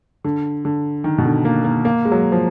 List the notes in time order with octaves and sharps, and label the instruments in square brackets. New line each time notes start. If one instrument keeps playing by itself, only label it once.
[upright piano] D3
D3
D#3
B2
D3
A#3
A#3
A#3
G#3
F#3
F3